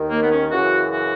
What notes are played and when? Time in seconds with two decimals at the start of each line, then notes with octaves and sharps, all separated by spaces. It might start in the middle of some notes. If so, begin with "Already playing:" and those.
Already playing: D#2 D#3
0.10 A#3
0.22 B3
0.31 C#4
0.51 F#2 C#3 E3 F#4
0.92 F#4